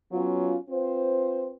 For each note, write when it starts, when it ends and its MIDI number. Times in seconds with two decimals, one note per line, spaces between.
0.12 0.57 54
0.12 0.57 59
0.12 0.57 61
0.12 0.57 65
0.70 1.54 60
0.70 1.54 65
0.70 1.54 71
0.70 1.54 72